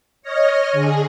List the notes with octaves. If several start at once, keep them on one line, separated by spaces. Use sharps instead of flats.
C#5 D#5 F6 A#6
D3 G#4